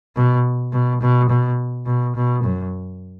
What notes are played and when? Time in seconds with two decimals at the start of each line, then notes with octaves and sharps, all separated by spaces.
0.16 B2
0.73 B2
1.01 B2
1.29 B2
1.86 B2
2.16 B2
2.44 F#2